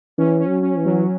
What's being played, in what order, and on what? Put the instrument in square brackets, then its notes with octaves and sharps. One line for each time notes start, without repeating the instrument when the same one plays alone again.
[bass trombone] E3 [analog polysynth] C#4
[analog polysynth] C#4
[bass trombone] F#3
[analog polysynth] C#4
[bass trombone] E3
[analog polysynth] F#3